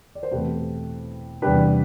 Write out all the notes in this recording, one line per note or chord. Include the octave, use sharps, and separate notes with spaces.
D5
C5
E2 B2 A3 C4 G4 B4
E2 C3 G3 D4 G4 B4